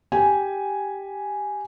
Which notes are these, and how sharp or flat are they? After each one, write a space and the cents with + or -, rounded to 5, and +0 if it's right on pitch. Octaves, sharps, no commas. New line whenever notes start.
G4 +0 G#5 +0